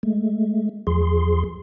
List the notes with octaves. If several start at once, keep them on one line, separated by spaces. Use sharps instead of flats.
G#3 A3
E2 F3 G#4 C6